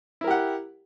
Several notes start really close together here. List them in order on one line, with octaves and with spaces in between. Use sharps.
E4 A#4 G4 F#5